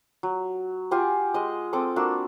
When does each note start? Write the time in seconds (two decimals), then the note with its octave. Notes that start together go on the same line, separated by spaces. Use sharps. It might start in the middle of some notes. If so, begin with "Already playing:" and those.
0.23 F#3
0.91 F4 G4 F#5 G#5
1.34 G#3 D#5
1.73 C4 A4 D6 D#6
1.96 A#3 D4 F#4 E6